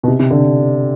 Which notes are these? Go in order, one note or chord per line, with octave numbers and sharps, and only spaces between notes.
B2
C3
C3
D3